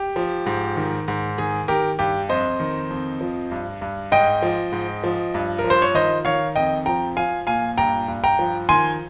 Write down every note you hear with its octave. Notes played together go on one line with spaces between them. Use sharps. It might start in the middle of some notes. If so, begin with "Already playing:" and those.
Already playing: G4
F3
G#2
D#3
G#2
D#3 G#4
D#3 G4 A#4
G2 G4
F2 C5 D#5
D#3
F2
F3
G2
G2
G#2 D#5 G5
F3
G#2
F3
G2
A#4
F3
C5
C#5
D#3 C5 D#5
D#3 C#5 F5
F2 D#5 G5
F3 G5 A#5
F3 F5 G#5
A#2 F5 G#5
G2 G5 A#5
G2
G5 A#5
F3
D#3 G#5 C6